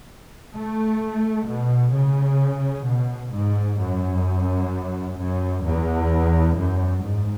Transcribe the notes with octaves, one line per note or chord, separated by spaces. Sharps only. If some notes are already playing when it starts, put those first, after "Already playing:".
A3
B2
C#3
B2
G#2
F#2
F#2
E2
F#2
G#2